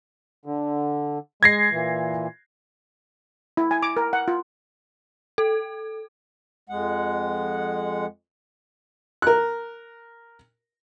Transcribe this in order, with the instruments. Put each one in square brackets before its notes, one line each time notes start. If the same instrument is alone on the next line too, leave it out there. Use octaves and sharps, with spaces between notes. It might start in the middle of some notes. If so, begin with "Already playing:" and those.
[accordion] D3
[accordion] G#3 [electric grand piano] G#6 A#6 C7
[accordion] A#2 E3
[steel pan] E4
G#5
D6
A#4
F#5
F4
[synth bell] A4
[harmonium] F2 G#3 F#5
[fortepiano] A#4 F#6